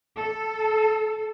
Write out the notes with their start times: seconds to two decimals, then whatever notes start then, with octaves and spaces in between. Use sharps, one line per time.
0.17 A4